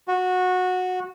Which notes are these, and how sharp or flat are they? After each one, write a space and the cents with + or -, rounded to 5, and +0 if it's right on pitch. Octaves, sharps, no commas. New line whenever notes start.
F#4 -15